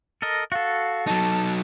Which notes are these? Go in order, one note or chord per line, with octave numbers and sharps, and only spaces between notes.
A4 A#4 D#5
F#4 A4 F5
F#3 D#4 A5